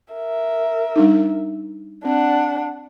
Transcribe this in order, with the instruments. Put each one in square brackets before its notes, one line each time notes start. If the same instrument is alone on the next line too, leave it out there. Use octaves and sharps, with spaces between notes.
[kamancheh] A#4 E5
[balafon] G3 D4 D#4
[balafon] C4 [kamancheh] D4 F#5